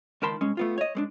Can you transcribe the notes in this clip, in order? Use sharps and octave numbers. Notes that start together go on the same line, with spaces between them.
C#2 D#3 A#4 A5 B5 C6
C2 G#3 C#4
A3 B3 F4
C#5 D#5
G#3 A3 D4